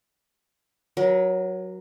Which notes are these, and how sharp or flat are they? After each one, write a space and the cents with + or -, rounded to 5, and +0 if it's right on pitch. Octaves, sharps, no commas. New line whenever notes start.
F#3 +0 A#4 +40